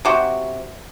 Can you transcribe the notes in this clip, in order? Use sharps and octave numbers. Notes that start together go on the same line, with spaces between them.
C3 F#4 G4